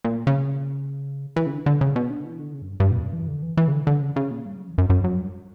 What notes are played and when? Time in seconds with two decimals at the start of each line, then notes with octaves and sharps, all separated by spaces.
0.05 A#2
0.27 C#3
1.36 E3
1.46 C#3
1.52 D3
1.66 D3
1.81 C#3
1.96 B2
2.10 D3
2.25 E3
2.39 D3
2.54 C#3
2.62 F#2
2.69 G2
2.80 G2
2.91 B2
2.98 E2
3.02 F#2
3.13 E3
3.28 D3
3.43 E3
3.57 E3
3.68 C#3
3.72 D3
3.87 D3
4.01 C#3
4.16 C#3
4.31 A#2
4.45 G2
4.56 F#2
4.68 E2
4.78 F#2
4.90 F#2
5.04 F#2
5.20 G2